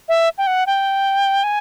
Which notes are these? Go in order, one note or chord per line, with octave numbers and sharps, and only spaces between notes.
E5
G5
F#5
G5
G#5